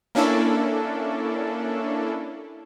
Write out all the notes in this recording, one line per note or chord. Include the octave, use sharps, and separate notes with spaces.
A#3 C#4 D4 E4 A4